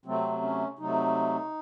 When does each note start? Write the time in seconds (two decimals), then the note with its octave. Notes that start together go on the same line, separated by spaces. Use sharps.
0.05 C3 F#3 A3 C4
0.42 C#4
0.79 C3 F#3 A3 D#4